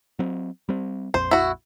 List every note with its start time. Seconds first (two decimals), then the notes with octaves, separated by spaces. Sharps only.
0.19 F#3 C4
0.69 G3 C4
1.14 A#1 F2 C5
1.31 E4 F#4